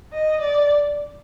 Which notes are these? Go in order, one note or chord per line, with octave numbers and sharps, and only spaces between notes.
D#5
D5